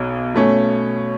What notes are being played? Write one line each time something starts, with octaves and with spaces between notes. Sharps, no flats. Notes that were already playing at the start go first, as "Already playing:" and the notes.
Already playing: B1 B2
B2 A3 C#4